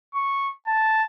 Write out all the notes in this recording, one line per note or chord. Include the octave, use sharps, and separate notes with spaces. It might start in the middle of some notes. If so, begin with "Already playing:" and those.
C#6
A5